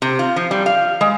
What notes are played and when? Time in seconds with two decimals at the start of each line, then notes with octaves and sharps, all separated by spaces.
0.02 C3
0.19 F4
0.36 F3
0.51 G3
0.66 F5
1.01 G#3